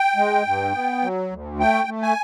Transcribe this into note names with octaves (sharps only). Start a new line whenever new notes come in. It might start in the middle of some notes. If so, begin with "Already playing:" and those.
Already playing: G5
G#3
G2
B3
F#3
D2
A3 G5
A3
G#5